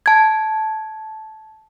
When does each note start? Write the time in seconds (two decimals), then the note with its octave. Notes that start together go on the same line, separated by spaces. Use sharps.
0.06 A5 G#6